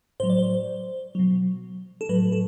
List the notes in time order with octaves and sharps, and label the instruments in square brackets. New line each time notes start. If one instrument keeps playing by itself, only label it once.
[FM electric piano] A2 F#3 C5
D5
C5
B2 F#3
A4
A2 F#3 B4
A4